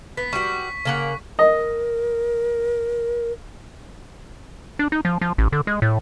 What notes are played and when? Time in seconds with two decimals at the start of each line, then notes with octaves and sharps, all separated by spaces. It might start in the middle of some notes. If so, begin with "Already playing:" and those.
0.17 B3 B6
0.33 G3 F#4 C#6 B6
0.85 C#3 A#3 F#5
1.39 A#4 D#5
4.79 D4
4.92 D#4
5.05 F3
5.21 F3
5.38 A1
5.52 D3
5.67 G#3
5.82 A2